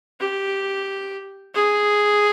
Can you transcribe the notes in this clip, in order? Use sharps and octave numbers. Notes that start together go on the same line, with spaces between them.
G4
G#4